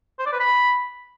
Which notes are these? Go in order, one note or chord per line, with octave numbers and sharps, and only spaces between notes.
C5
D5
B4
B5